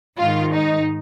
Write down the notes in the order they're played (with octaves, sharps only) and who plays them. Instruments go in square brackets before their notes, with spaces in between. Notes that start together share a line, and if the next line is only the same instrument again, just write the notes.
[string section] G#2 D#3 F4
D#4